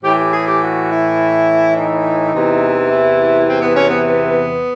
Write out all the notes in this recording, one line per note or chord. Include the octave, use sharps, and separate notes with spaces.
A2 E3 G4
G4
G#4
G4
F#4
E4
D#4
E2 C3 E3
E4
C4
B3
C#4
B3
B3